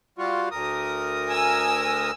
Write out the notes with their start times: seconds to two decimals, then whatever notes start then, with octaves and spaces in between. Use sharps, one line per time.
0.18 G3 F4 F#4
0.51 D2 A#4 D#6
1.29 G#5 E6